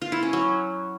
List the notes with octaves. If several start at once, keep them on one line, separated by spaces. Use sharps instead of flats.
F4
E4
C#4
F#3